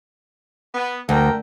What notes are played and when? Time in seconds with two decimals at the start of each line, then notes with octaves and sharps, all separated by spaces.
0.74 B3
1.09 D2 A3 A#4 G5